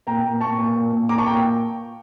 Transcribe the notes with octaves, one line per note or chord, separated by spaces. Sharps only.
A#2 G5 A#5
A#2
A#2 A5 C#6
A#2
A#2
A#2
A#2 A#5 D6
A5 C#6
A#2 G5 A#5